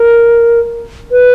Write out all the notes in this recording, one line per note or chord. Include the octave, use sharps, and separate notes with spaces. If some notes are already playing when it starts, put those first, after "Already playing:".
Already playing: A#4
B4